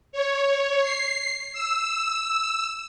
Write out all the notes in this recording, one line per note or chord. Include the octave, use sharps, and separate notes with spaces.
C#5
C7
E6